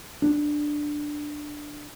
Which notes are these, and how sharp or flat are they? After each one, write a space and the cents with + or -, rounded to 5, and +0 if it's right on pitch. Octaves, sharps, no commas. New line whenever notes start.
D4 +10